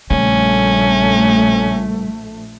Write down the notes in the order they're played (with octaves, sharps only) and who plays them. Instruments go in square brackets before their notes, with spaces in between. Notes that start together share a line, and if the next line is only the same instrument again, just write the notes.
[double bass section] A#1 A3 [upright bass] C#3 G3 [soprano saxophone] C#4